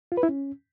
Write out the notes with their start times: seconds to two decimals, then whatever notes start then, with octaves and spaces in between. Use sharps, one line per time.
0.12 F4
0.17 B4
0.23 E4
0.29 C#4